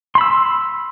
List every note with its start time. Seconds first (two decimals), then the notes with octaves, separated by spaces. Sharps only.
0.15 C6
0.18 B5
0.21 E6